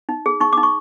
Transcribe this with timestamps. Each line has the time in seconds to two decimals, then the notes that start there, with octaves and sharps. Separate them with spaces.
0.09 D#4
0.26 G#4
0.40 D#4 C#6
0.53 D#4 D6
0.63 C#6